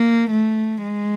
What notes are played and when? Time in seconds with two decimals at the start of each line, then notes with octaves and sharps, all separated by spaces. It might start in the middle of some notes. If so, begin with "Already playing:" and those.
Already playing: A#3
0.31 A3
0.83 G#3